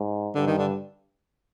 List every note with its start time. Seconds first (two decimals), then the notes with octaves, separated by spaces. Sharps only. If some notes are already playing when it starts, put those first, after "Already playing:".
Already playing: G#2
0.35 G2 D3
0.47 D#3
0.58 D3